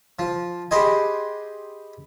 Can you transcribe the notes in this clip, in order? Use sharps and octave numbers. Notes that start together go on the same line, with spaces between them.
F3
G4 G#4 B4 C5 D#5 G#5